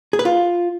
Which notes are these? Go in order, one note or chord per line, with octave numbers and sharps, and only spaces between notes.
G#4
B4
F4